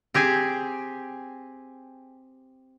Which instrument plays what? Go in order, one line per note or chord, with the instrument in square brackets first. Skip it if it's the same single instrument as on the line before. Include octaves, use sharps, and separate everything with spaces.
[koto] C4 G4 G#4 G#5